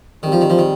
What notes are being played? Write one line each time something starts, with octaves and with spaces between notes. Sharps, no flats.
G#2 D#3 G3 C4 G4
F3
D#3
F3
D#3